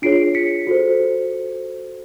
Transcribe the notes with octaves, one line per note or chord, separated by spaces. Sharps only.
D4 F4 G#4 C#5 C7 D7
B6 C#7
F#4 A4 C5